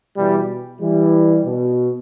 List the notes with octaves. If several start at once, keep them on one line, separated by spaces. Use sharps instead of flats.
B2 E3 G3
E3 G3
B2